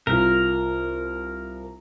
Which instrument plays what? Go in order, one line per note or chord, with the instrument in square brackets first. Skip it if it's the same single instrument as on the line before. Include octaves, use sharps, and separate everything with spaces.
[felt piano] C2 F4 [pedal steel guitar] A#4